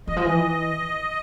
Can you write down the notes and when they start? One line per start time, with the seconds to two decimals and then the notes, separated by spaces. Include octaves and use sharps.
0.07 E3 D#5
0.16 F3
0.25 E3